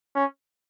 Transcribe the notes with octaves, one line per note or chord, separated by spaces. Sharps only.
C#4